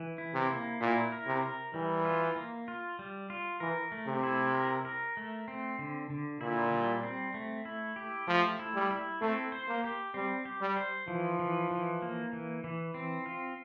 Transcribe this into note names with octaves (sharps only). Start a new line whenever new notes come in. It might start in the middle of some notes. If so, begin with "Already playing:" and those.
Already playing: E3
E4
C3
A#3
A#2 E4
A#4
C3
A#4
E3 G3
F4
A#3
F4
G3
F4
E3 A#4
A3
C3
E4
A#4
A#4
A3
C4
D3
D3
A#2 E4
G3
C4
A3
E4
G4
F3 A3
E4
G3
E4
A3 C4
C5
A#3
G4
G3 C4
G4
G3
C5
E3 F3
E3
E3
A#3
E3
E3
C4
F4